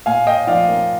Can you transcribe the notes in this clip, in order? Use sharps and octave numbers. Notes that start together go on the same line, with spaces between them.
A#2 F5 G#5
A#2 D#5 G5
F3 D5 F5
A#3